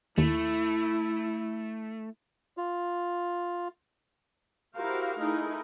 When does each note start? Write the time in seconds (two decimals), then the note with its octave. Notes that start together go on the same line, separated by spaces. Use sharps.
0.18 D#2 A3 E4
2.57 F4
4.75 E4 F#4 G4 A#4 C5 F5
5.18 A3 D#4 E4 G#4 A#4